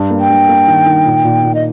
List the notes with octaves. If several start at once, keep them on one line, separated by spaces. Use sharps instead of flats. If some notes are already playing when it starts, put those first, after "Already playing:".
Already playing: G2
A#3
G5
G2
A#3
D#3
D#3
A#2
A#2
A#2
D#5